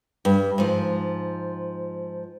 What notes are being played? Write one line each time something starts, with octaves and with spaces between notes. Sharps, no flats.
G2
G#2 F3